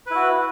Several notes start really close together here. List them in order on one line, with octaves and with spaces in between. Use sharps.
B4 E4 F#4